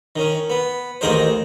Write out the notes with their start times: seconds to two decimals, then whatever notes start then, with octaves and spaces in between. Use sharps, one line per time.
0.16 D#3 C#4
0.50 B3
1.01 A1 D#2 D#4 G#4 A#4 C5